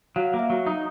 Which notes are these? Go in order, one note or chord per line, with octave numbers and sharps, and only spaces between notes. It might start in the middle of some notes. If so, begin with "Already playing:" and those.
F#3 F5
A#3
E5
F#3
D#4